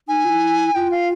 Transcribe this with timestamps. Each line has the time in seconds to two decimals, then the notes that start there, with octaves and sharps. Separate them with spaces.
0.08 D#4 G#5
0.25 F4
0.30 E4
0.75 F4 G5
0.91 F5